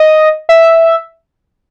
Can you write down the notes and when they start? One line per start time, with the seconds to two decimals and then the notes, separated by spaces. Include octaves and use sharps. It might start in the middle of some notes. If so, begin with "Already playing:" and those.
Already playing: D#5
0.49 E5